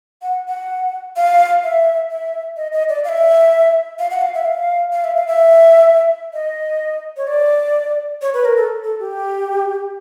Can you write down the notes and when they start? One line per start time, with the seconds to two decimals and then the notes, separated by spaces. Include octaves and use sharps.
0.22 F#5
0.48 F#5
1.16 F5
1.64 E5
2.10 E5
2.57 D#5
2.72 D#5
2.89 D5
3.04 F5
3.09 E5
3.99 F5
4.11 F#5
4.21 F5
4.34 E5
4.45 F5
4.92 F5
5.04 E5
5.16 F5
5.27 E5
6.33 D#5
7.17 C#5
7.28 D5
8.22 C#5
8.34 B4
8.45 A#4
8.57 A4
8.84 A4
9.00 G4